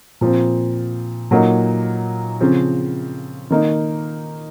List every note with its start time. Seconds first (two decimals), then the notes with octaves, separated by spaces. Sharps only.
0.21 A#2 F3 C4
1.31 A#2 F#3 A#3 D#4
2.41 C#3 F3 C4
3.50 D#3 A#3 D#4